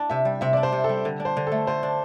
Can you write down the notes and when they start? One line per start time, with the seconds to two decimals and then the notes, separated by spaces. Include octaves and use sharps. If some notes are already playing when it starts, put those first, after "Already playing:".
Already playing: D4 E4
0.10 C3 E5
0.25 G3
0.41 C3 E5
0.53 D4 D5
0.63 C5
0.72 C3
0.84 A4
0.89 G3
1.05 D3
1.20 D4
1.25 C5
1.37 D3
1.47 A3 A4
1.67 D3 C5
1.83 D4